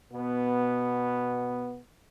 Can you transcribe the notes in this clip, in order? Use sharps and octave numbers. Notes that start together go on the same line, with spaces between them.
B2 B3